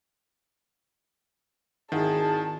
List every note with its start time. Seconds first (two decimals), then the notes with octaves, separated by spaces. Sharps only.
1.92 G#1 D#3 E4 G#4 F#5 A5